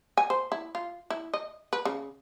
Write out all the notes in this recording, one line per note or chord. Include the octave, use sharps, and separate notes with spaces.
G#5
C5
E4
F4
E4
D#5
B4
C#3